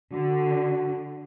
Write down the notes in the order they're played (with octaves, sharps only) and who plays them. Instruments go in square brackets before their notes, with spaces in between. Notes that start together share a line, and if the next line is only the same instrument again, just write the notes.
[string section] D3 [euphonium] F#4